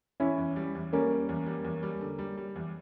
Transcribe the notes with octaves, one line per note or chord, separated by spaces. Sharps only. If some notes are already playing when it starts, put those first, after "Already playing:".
E2 C#4 E4
E2
G3
E2
G3 A#3 C#4
G3
E2
G3
E2
G3
D3
G3
G3
E2